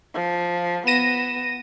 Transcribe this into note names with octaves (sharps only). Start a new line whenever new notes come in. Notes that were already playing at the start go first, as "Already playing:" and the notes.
F3
B3 A#6 D#7 E7